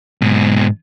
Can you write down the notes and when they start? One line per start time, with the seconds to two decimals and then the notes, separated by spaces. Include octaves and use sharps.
0.22 G#2 B2